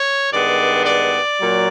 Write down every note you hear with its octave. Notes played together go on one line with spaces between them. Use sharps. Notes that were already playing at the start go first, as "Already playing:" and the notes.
Already playing: C#5
G2 D#3 G#3 B3 D5
D5
A#2 F#3